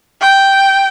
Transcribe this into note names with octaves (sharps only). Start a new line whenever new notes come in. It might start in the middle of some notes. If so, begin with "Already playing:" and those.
G5